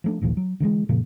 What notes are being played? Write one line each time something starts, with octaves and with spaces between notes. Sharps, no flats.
F3 A3 D4
G#1 D#2 A#2 F3
F#3
D3 E3 G3 G#3
F#2 A#2 C#3 F3